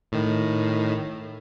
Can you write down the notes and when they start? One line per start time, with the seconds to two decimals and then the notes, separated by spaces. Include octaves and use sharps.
0.12 A2 D#3